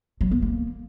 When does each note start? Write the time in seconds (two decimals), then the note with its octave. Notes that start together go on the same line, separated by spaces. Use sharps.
0.21 F#3
0.31 B3
0.42 A#3